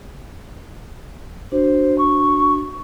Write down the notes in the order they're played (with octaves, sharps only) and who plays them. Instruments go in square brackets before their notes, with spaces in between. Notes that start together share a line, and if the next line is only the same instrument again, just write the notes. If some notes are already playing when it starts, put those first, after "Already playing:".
[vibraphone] D4 F#4 [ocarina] C5
[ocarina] C#6